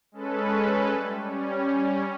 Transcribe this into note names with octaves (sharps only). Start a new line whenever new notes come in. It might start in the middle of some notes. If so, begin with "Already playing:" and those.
G#3 C#4 A4 B4
G3 A3
G3 C#4